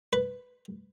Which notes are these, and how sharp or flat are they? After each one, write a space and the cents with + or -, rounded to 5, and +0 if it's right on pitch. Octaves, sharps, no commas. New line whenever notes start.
B4 +5